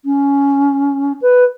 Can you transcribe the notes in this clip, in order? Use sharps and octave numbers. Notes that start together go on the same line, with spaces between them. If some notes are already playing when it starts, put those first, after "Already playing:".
C#4
B4